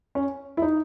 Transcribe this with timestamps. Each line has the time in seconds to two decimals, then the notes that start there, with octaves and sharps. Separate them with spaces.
0.15 C#4
0.57 E4
0.62 D#4